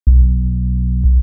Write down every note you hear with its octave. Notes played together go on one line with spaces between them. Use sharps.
B1